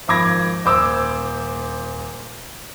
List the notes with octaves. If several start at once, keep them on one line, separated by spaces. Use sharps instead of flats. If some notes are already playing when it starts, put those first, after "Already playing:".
G#1 F3 B5 D6 G#6 A#6
D#1 C5 D6 E6